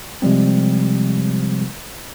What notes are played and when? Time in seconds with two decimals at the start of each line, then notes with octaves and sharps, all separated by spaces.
0.22 C3 F3 G3 G#3 C4